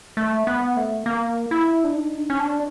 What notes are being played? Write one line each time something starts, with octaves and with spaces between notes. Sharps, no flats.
A3
B3
A3
A#3
E4
D4
D#4
D4
C#4
D4